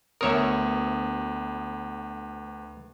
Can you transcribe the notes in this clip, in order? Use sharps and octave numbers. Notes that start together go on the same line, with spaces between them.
D2 B3 A#4 C#5 E5 D#6